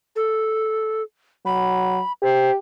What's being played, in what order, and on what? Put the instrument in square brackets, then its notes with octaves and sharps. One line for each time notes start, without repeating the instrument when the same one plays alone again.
[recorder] A4
[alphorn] F#3 [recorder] B5
[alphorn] G4 [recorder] C5